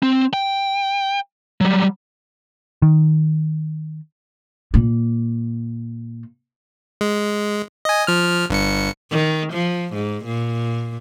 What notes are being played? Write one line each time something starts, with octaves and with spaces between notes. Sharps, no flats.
C4
G5
F#3 G3
D#3
A#2 A#3
G#3
D#5 G#5
F3 F6
G1 G2 C#7
D#3
F3
G#2
A#2